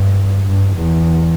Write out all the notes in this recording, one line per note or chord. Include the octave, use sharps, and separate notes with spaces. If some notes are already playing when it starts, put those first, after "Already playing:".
Already playing: G2
G2
E2